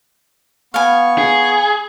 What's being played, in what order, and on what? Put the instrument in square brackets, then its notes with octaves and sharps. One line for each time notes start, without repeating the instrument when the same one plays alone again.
[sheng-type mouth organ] B3 C#6 [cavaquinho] F5 G#5
[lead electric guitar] G#4